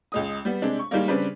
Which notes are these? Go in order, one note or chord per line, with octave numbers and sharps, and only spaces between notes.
C#2 G#3 D#6
G3 B3
C3 G#3 D4
C#6
D#3 G3 G#3 A#3
C#3 G3 C4 D4 B4